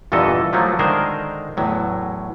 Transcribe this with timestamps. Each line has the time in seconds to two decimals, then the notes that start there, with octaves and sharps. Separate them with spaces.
0.12 E2 G2 A#2 E3 A4 D#5
0.53 F3 F#3 A3 A#3
0.79 D3 D#3 G#3 G#4 A#4 C5
1.57 E2 A2 F#3